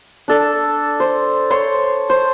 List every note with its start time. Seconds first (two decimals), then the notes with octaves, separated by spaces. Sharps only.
0.28 D4 A4
1.00 C5
1.50 C5 C#5 C6
2.10 C5